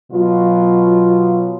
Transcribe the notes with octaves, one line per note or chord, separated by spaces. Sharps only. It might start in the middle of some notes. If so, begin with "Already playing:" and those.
B2 F#3 F4